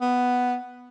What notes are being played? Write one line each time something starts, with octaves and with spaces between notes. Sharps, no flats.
B3